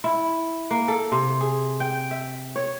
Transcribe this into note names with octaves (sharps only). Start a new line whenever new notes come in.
E4
A#3
A4
C3
G#4
G5
E5
C#5